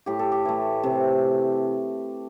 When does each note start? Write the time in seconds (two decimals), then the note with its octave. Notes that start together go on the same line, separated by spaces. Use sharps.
0.06 A2 G4
0.19 A4
0.32 G4
0.45 E3 A3
0.84 C3